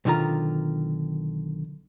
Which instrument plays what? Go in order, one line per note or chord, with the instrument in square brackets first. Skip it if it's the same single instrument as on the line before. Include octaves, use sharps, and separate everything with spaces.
[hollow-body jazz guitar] B1 D3 D#3 F4 A#5